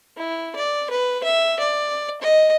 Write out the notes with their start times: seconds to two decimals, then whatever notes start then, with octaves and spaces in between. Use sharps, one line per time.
0.17 E4
0.55 D5
0.90 B4
1.23 E5
1.59 D5
2.21 D#5